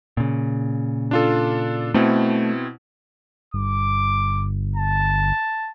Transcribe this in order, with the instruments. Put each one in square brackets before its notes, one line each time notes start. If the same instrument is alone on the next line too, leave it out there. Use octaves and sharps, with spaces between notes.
[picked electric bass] A#2 C#3
[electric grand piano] D4 F4 A4
[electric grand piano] B2 C4 E4 [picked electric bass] A3
[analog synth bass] G1 [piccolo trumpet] D6
[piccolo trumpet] A5